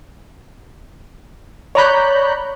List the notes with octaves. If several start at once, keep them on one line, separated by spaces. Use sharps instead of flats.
C#5 D5 A#5 B5 F#6 G6